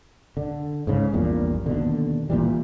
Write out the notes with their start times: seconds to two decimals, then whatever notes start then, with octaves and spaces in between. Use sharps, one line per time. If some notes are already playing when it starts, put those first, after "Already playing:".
0.37 D3
0.87 G#2 C#3
1.13 A#1 E2 G2 A#2
1.66 D#2 B2 D3
2.30 A#2 E3 G3